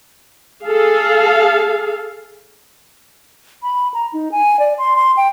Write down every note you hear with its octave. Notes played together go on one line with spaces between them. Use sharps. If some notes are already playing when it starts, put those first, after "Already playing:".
G#4 A4 F5
B5
A#5
D#4
G#5
D5
C6
C6
G5